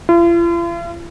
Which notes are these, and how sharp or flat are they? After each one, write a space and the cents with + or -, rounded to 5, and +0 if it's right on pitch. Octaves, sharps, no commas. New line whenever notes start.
F4 -45